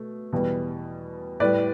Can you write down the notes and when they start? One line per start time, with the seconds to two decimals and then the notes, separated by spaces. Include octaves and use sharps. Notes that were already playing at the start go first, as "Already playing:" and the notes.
Already playing: B2 A3
0.33 E2 B2 G3
1.40 A2 G3 B4 D5